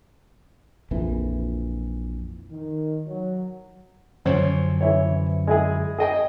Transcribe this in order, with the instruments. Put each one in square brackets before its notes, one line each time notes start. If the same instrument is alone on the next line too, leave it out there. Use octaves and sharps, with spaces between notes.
[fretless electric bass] A#1 F2 E3
[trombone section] D#3
F#3
[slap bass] F#2 D3 F3 [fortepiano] C#4 C5 C#5
[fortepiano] E3 E4 C#5
G#3 E4 G#4
G#4 D#5 G5